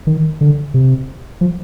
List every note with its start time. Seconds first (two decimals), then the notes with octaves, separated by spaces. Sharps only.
0.07 D#3
0.41 D3
0.74 C3
1.41 F3